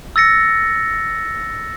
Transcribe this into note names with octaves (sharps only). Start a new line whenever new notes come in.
E6 A6 A#6 C#7